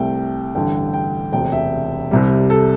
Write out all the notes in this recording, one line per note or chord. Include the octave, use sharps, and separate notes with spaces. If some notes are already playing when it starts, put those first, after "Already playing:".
Already playing: C2 C3 A3 G5
A1 G2 D3 G5
G5
E1 D2 C3 G5
E5
C2 C3 G3
A4